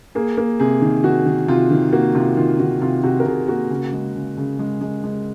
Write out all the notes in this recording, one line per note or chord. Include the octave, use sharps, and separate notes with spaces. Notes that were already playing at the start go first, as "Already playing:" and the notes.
A#3 G#4
A#3
C3 G#4
D#3
D#3 F#4
D#3
C3 F4
D#3
A#3 F#4
C3 F4
D#3 F4
D#3 F#4
C3 F4
C3 F#4
A#4
C3 G#4
A#3 F#4
C#3
G#3
C#3
C#3
G#3
G#3
G#3